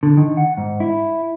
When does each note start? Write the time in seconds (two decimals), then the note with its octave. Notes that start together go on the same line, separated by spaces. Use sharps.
0.03 D3
0.17 D#3
0.37 F#5
0.57 G#2
0.80 E4